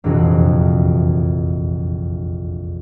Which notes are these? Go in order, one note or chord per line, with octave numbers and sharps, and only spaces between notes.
E1 A#1 F2 C3 E3 F#4